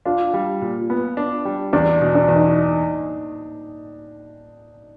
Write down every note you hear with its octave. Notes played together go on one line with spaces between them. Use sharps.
D4 F4 F5
G3
A#2
B3
D4
G3
E2 D4 D5
B2
D4 D5
E2
D#4 D#5